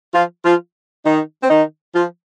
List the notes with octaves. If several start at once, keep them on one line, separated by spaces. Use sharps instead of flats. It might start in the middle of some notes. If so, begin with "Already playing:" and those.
F3 F4
F3 F4
D#3 D#4
C4
D#3 D#4
F3 F4